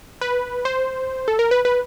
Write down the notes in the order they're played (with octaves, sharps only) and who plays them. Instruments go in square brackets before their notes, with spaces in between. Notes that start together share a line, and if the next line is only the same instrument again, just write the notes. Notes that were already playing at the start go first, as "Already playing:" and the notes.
[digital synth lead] B4
C5
A4
A#4
B4
B4